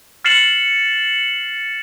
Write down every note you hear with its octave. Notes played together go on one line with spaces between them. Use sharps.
F6 A6 C7 C#7 E7 F#7